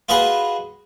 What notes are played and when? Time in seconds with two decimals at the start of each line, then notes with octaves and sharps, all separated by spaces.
0.09 F4 F#4 G#4 B4 D#5 F#5